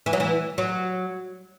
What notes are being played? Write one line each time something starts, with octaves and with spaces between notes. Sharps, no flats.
E3
F#3
E3
F#3